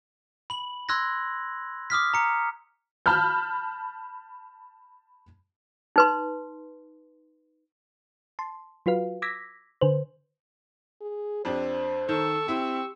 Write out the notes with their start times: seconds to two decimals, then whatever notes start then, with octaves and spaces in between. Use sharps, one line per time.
0.50 B5 F#7
0.89 C6 E6 F#6 G#6 A#6
1.90 D6 D#6 F6 B6
2.14 A#5 C#7
3.06 A5 B5 F6 G6
5.96 D#4 B4 C6
8.39 A5 C6
8.86 F#3 F4 F#4 B4 F5
9.22 D6 E6 G#6 A#6 B6
9.81 D3 B4 C5
11.01 G#4
11.45 F2 D4 G4 C5
12.09 D#3 A4 C#6 E6
12.48 C4 E4 G4